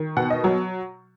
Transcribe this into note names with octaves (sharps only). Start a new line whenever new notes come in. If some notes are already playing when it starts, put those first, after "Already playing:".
Already playing: D#3
B2 F#5
D#5
F#3 F#5